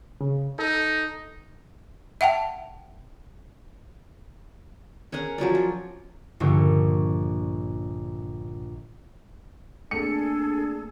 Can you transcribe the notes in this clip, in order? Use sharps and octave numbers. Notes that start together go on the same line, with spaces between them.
C#3
D#4 A4
E5 F#5 G5 A5
C#4 G#4 A#4 F#5
F3 F#3 C#4 D5
F4
A#1 G2 D3 C#6 C#7
A3 A#3 C4 D4 G#4 A4 C#7